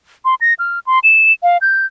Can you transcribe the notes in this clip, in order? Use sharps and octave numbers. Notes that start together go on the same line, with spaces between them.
C6
A#6
F6
C6
E7
F5
G6